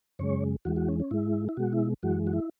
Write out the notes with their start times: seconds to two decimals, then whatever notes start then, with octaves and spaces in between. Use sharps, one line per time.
0.19 F#2 C#3 G#3 C#5
0.65 E2 E3 G#3 F#4
0.76 F#4
0.88 C#4
1.00 C#4
1.11 G#2 G#3 E4
1.49 E4
1.57 B2 G#3 F#4
1.73 E4
2.03 F#2 E3 G#3 F#4
2.27 F#4
2.33 E4